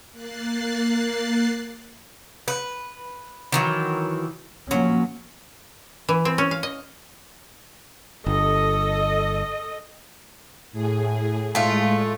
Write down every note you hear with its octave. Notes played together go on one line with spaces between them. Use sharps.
A#3 F#6 A6 C7
B4
D#3 E3 F#3
F3 F#3 A#3 C#4
E3
C4
C#4
F5
D#5
G1 A4 D#5
A2 G#4
A2 G#3 A3 F4